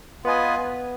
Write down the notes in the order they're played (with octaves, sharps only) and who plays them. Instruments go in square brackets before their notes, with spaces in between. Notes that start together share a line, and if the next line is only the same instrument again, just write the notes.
[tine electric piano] B3 [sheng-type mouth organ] F4 B4 D#5 G#5